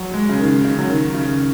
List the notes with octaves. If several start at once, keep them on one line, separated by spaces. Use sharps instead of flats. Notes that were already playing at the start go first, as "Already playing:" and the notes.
Already playing: F#3
G#3
C#3
D#3
C#3
F#3
D#3
C#3